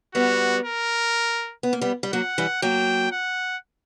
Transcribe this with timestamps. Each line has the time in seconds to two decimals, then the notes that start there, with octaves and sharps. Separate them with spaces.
0.15 G3 B3 F#4
0.65 A#4
1.63 B3
1.73 A#3
1.81 G3 B3
2.03 G3
2.13 F#3 A#3 F#5
2.38 E3 G3
2.62 F#3 A#3 G5
3.12 F#5